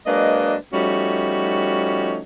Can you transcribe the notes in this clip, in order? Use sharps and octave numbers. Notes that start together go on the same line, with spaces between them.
F#3 G#3 A#3 D4 B4 D#5
F3 G3 A3 C#4 D#4 F#4